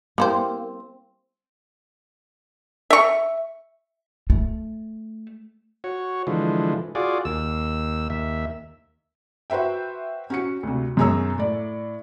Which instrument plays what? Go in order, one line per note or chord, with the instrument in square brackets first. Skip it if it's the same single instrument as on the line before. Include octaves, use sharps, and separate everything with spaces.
[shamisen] G3 E4 C5 [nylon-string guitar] A#3 [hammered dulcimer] C4
[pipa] E5 C#6
[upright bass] A3
[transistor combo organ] F#4 C#5
D3 E3 F3 G#3
F4 F#4 G#4 D5
D#2 E6
D#2 E5
[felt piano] F#4 B4 C5 E5 G5
C#4 F#4 C#7
D2 C3
F#2 B2 G#4 C#5 A#5 E6
A2 D5